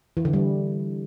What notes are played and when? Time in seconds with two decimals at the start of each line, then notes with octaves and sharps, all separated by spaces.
0.17 E3
0.25 D3
0.33 G3